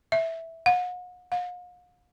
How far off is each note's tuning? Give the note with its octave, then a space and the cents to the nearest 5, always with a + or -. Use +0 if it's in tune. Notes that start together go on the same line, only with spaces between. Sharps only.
E5 -5
F#5 -40
F5 +45